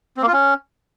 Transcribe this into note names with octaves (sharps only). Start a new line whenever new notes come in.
C4
A#3
F4
C#4